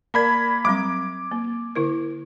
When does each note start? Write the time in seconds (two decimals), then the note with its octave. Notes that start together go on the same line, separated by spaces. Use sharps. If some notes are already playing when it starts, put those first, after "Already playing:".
0.14 A#3 A#4 D5 A5 B5 G#6
0.65 F#3 G3 C4 D6
1.31 A#3
1.76 D3 E4 A#4